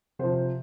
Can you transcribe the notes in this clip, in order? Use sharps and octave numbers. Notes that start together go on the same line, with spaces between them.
C3 F3 C5